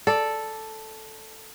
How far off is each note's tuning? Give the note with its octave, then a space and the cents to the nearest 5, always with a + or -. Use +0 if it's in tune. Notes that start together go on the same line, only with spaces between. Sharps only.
A4 +0 D5 +0